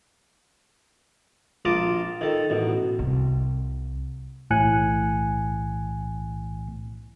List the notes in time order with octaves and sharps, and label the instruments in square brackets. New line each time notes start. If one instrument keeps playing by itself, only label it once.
[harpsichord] A#1 F4 A5 A#5 D6 D#6
D#3 A4
A1 B2
[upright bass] C2
[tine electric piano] B1 A2 E3 G#5 F#6 C#7